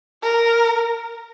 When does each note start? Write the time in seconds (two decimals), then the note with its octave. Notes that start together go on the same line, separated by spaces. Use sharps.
0.23 A#4